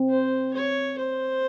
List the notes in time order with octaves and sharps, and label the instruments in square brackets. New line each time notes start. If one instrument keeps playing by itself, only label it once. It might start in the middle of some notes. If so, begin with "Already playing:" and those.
Already playing: [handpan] C4
[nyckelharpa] C5
C#5
C5